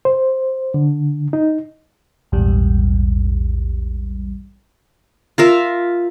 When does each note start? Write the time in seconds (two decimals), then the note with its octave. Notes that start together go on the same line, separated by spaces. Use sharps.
0.05 C5
0.74 D3
1.33 D#4
2.32 A#1 E2 G#2 G3
5.38 F4 A#4 E5